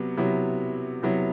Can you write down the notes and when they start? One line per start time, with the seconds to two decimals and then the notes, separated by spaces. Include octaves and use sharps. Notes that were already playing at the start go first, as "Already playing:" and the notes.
Already playing: C3 F#3 B3
0.17 C3 F#3 B3 E4
1.03 C3 F#3 B3 E4